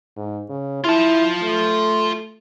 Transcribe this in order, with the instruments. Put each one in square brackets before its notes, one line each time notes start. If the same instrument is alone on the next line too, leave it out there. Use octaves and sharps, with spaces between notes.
[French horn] G#2
C#3
[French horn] E4 [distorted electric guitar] F4 A5
[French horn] A3